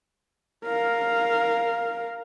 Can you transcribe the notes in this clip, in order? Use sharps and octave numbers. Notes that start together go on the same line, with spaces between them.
A#4 F5